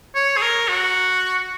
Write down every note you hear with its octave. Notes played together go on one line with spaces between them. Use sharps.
C#5
G#4
A#4
F#4